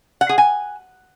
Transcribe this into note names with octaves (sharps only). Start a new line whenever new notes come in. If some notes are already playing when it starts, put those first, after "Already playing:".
F#5
G#4
G#5